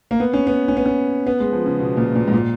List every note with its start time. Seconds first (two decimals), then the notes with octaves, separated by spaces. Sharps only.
0.11 A#3
0.20 B3
0.33 C#4
0.47 B3
0.68 C#4
0.77 B3
0.86 C#4
1.27 B3
1.40 G#3
1.52 F3
1.66 C#3
1.80 B2
1.97 A#2
2.15 A#2
2.28 G#2
2.34 A#2